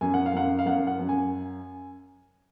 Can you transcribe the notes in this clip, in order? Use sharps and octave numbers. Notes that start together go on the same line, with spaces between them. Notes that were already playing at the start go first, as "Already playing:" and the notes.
F#2 G#5
F#5
F5
F#2 F#5
F5
F#2 F#5
F#5
F#2
G#5